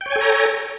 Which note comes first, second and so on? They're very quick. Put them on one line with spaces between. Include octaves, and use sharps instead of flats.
G5 C#5 G#5 A4 A#5